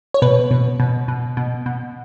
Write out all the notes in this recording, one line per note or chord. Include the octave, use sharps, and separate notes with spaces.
C#5
B2 B4
B2
B2
B2
B2
B2